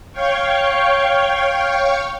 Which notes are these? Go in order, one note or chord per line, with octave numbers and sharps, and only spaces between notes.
C#5 F5 G5 C#6